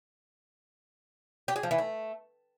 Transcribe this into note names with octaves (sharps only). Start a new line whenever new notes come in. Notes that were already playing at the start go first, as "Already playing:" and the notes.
G4
G#4
F3
E3
A3